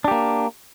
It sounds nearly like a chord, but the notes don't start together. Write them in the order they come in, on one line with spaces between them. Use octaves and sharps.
D4 G4 A#3